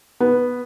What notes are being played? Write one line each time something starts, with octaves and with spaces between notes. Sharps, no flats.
B3